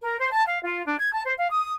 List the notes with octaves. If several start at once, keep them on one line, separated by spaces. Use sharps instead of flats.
A#4
C5
A5
F5
F4
D4
G#6
A5
C5
F5
D#6